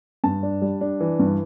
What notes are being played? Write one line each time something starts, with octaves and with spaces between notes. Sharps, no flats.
G2 A5
D4
G3
D4
E3
G2